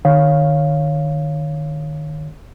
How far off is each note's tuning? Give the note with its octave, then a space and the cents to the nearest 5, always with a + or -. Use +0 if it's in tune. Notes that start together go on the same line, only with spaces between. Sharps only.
D#3 -35 C#5 +0 F5 +0